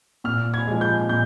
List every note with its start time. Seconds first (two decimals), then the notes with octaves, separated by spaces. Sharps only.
0.24 A#2 F6
0.54 G#6
0.67 F3 G#3
0.81 G6
1.09 A#2 G6